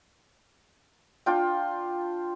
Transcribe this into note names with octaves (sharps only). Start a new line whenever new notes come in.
D4 F4 G5